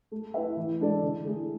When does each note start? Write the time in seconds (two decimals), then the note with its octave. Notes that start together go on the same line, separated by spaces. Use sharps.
0.12 A3
0.34 E4 B4 E5
0.57 E3
0.80 G#3 D4 A4 D5
1.03 D3
1.25 A3 E4 G#4